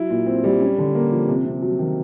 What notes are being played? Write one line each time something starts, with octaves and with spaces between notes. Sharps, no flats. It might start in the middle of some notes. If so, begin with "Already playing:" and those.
Already playing: F#3 E4
A#2
C4
G3
C#4
D3
A#3
F3
C3
C3
F#3
D#3